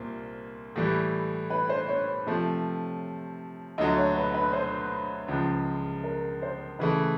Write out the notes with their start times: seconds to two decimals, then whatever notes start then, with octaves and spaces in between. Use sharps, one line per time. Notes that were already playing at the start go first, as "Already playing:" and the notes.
Already playing: C2 A#2 C5
0.76 A2 E3 G3
1.50 B4
1.69 C5
1.88 C#5
2.27 C3 F3 A3
3.78 D2 D3 F#3 D#5
3.97 C#5
4.16 B4
4.34 B4
4.53 C5
5.28 C#2 C#3 F3
6.04 A#4
6.42 C5
6.79 C#3 E3 A3 B4